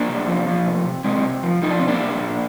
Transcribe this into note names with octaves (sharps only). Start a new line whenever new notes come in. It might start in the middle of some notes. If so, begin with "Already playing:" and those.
Already playing: A#3 D4
C3
F3
F3
C3
C3
C3 G#3 C4
C3
F3
F3 D#4
D4
C3 C4
A#3 D4
C3
A#2